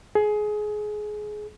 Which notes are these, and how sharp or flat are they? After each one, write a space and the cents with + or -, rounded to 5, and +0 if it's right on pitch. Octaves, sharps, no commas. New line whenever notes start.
G#4 +20